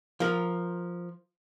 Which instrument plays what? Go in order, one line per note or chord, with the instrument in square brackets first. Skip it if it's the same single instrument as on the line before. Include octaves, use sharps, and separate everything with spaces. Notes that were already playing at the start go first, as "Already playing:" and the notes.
[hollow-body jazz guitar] F3 A#4